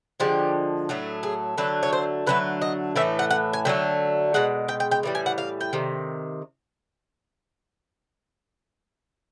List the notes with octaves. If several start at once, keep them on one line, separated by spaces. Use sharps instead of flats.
D3 F3 G#3 G4
A2 F#3 A3
G#4
D3 F#3 A3 B4
C#5
C5
D3 F#3 A3 B4
D#5
A2 E3 A3 E5
F#5
F#5
G#5
D3 F#3 A3 G5
B2 G#3 F#5
G5
G5
G5
A2 E3 G3
G#5
F#5
F5
G5
C3 D#3